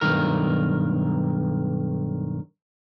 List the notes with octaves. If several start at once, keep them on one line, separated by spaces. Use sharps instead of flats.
B1 G2 D#3 A#4